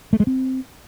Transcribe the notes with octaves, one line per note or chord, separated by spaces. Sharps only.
A3
G#3
C4